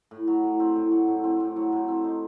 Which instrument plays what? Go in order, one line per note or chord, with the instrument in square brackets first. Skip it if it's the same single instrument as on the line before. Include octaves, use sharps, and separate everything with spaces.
[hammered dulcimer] A2
F#3
A2
C4
A2
F#3
A2
C4
A2
F#3
A2
C4
D#4